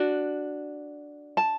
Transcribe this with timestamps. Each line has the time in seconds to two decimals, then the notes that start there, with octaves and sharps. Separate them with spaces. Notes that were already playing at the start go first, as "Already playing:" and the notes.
Already playing: D4 F#4
1.37 A5